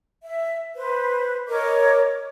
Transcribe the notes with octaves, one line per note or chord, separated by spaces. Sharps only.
E5
B4 C5
A#4 C#5 D#5 D6